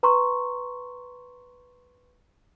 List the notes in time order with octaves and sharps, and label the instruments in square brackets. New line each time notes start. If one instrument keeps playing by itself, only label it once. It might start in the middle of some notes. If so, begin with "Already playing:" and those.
[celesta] B4 A#5 C6 C#6